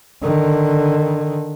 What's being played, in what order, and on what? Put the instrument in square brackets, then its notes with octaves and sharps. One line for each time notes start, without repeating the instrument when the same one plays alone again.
[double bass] D3 D#3